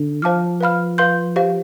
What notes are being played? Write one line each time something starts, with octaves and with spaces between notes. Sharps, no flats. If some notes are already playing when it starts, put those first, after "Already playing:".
Already playing: D3
F3 C5 F5 A5 D6 F6
B4 F5 B5 F6
B4 F5 C6 G6
G4 C5 F5